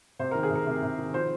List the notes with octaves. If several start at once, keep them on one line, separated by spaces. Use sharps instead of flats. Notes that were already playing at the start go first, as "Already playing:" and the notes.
C3 C5
D#3 A#4
G#4
C3 A#4
C3
C3
D#3
F3 C5